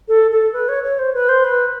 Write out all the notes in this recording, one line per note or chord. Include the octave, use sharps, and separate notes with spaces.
A4
A4
B4
C#5
C#5
C5
B4
C5
B4